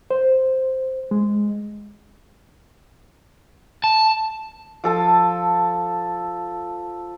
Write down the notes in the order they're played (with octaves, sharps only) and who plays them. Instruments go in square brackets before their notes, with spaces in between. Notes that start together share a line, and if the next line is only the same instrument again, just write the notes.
[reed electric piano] C5
G#3
[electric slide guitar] A5
[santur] F3 A4 A5